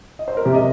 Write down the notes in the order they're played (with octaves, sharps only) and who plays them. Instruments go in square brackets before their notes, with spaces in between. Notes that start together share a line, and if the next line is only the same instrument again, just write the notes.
[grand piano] D#5
C5
A#4
[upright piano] C3 [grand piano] G4
[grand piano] D#5